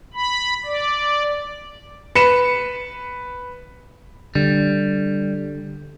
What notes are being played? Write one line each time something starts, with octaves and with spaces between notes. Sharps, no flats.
B5
D5
B4 C#7 E7
D3 G3